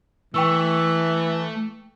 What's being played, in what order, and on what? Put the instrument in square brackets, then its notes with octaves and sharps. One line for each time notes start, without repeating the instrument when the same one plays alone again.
[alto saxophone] E3 [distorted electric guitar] A3 [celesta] G5 C#6 E6